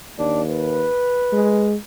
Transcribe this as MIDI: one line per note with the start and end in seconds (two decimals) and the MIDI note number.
0.18 0.87 39
0.18 0.42 62
0.49 1.70 71
1.32 1.76 56